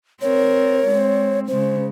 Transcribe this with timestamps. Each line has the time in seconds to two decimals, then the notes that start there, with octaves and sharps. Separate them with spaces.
0.21 C4 A#4 C#5
0.88 G#3 C4
1.48 C#3 G#3 C5